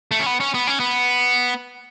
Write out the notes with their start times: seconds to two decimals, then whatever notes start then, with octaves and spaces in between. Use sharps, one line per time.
0.11 A3
0.20 C#4
0.26 B3
0.40 C#4
0.54 B3
0.67 C#4
0.80 B3